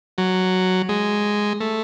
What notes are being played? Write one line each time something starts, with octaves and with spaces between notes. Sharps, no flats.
F#3
G#3
A3